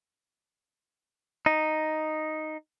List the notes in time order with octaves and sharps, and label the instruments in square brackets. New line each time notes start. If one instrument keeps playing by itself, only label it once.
[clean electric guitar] D#4